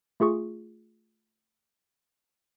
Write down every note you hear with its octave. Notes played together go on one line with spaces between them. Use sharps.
A3 F4 G#4 C#6